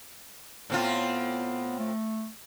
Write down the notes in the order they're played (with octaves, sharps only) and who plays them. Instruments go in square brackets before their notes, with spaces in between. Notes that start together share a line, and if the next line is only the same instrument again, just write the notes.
[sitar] A2 C4 F4 [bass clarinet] B3
[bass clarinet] A3